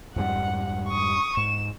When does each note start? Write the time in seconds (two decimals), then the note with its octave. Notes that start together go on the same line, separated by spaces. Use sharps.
0.16 F2 G#2 G3 F#5
0.88 C#6 D#6
1.37 G#2 E7